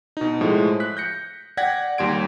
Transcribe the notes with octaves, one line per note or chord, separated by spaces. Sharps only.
B2 D#4
A2 F3 G#3
F#6 B6
G6 A#6 C#7
D5 F#5 G5 G#6 A#6 B6
D#2 G3 C6 G#6 D7